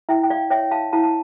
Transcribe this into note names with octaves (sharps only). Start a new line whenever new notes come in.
E4 E5 G5
G5
D5 F5
C#5 E5 G5
F5 A5
E4 F5 A5
A5